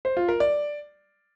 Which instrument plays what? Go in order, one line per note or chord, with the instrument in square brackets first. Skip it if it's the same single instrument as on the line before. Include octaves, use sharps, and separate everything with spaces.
[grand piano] C5
F4
A#4
D5